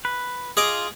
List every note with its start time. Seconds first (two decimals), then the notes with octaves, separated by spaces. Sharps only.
0.05 B4
0.57 F4 G#4 D#5 D6